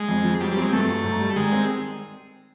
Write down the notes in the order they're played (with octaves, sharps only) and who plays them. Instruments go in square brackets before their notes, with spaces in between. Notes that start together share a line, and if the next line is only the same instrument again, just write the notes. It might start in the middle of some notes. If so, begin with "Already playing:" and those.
Already playing: [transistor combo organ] G#3
[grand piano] F2
F3
[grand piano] F#3 [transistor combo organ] G3
[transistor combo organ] G3
[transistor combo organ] G#3 [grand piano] C4
[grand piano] G2 [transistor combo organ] A3
[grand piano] F#3
G#2
G3
[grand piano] D#3 [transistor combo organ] G#3
[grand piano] C4